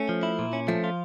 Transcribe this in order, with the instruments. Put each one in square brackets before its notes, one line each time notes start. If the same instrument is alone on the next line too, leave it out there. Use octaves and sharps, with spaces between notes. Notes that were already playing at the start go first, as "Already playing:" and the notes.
Already playing: [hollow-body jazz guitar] A3 [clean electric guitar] C#4
[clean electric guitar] F3
E4
A#2
C#4
[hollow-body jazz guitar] F3 [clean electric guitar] A3
[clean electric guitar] F4